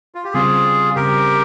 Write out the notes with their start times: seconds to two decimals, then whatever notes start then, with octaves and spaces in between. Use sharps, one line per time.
0.15 F4
0.24 G4
0.33 C#3 G3 C4 F4 G#4
0.95 C#3 G3 C4 G4 A#4